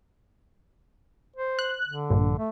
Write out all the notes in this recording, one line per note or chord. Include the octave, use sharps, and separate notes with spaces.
C5
F#6
D3
A#1 G2
A3